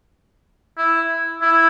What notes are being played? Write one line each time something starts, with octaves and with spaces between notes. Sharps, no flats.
E4
E4